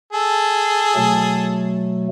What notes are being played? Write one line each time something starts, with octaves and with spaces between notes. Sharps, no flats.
G#4 A4
B2 F#3 A3